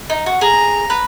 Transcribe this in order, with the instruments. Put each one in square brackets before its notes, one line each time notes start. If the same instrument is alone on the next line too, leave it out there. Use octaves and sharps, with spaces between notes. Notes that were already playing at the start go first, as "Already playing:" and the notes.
[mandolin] D#4
F#4
[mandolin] G#4 [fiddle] A#5
[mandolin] B4